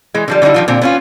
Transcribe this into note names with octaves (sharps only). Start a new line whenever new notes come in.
E3 G#3
D3 F3 G3
D3 F#3 G3 D#4 E4
D#3 F3 F4
A#2 D3 C4
B3 C#4 F4